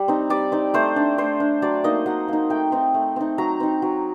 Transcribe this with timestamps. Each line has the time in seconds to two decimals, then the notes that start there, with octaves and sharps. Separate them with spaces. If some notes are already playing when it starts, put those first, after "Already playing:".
Already playing: G3
0.08 C4 D#4
0.30 G3 D5
0.52 C4 D#4
0.74 A3 C5
0.96 D4
1.18 A3 C5
1.40 D4
1.62 F#3 D5
1.84 A#3 D#4 D#5
2.06 F#3 F#5
2.28 A#3 D#4
2.50 A3 G5
2.72 C4 D#4
2.94 A3
3.16 C4 D#4
3.38 F#3 A#5
3.60 C4 D#4
3.82 F#3